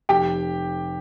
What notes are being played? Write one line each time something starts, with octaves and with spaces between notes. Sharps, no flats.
F1 G4 G5